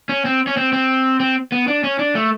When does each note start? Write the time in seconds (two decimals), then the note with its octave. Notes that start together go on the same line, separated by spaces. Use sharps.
0.09 C#4
0.25 C4
0.47 C#4
0.57 C4
0.73 C4
1.20 C4
1.52 B3
1.68 D4
1.84 C#4
1.99 D4
2.15 A3